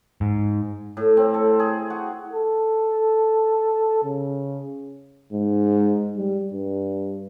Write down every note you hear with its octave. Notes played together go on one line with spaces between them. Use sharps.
G#2
A2
C4
A4
G#4
F#4
A4
C#3
G#2
G3
G2